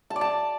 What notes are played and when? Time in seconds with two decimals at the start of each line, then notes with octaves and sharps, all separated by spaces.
0.10 A5
0.16 D5
0.21 A5